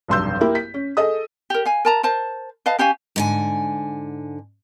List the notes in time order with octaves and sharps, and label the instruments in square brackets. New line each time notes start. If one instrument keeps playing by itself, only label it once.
[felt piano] F1 B1 G2 C6 E6 G6
A#3 E4 G4 A#4
B6
C#4
G#4 A4 D#5 D#6
[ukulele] G4 A#4
F5 G#5
A#4 A5 A#5
A#4 C5 A5
B4 D#5 F5 A5
C#4 G4 F5 G#5
[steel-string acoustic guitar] G#2 D3 G#5